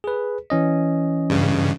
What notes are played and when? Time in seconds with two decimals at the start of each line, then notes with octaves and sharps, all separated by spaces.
0.04 G#4 B4
0.50 E3 C#4 D#5
1.30 G2 C#3